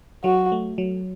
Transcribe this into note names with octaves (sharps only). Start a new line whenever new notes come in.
F#3 F#4
A3
F#3